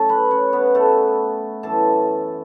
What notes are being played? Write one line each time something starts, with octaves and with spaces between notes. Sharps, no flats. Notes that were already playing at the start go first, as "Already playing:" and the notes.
Already playing: F#2 F#3 A3 C#4 A4 C#5 A5 C#6
B4 B5
C#4 C#5
B3 B4
A3 A4
F#2 E3 A3 C#4 A4 A5